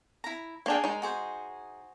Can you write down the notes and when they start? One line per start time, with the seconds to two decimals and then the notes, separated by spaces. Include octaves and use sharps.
0.24 E4 A#5
0.66 A#3 D4 G#4 A#4 G5
0.84 G#3 D#4
1.02 F#4 G#4 C5